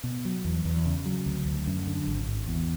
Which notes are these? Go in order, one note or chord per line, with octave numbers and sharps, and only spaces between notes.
B2
F#3
E2
E2
C#3
F#3
D2
D2
F#2
D3
G#1
G#1
E2